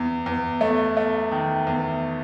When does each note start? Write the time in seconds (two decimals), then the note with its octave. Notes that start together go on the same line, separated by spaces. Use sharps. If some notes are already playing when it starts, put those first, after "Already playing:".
Already playing: E2
0.26 E2
0.61 A3
0.97 A3
1.32 D#3
1.67 E2